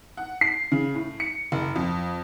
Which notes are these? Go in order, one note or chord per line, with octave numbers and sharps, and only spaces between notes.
F#5
C7
C#3
A2
C#7
F#1
F2